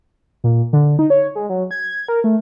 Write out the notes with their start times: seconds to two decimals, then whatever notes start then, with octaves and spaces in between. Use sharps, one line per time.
0.44 A#2
0.73 D3
0.99 D#4
1.10 C#5
1.35 G#3
1.49 F#3
1.71 G#6
2.08 A#4
2.24 A3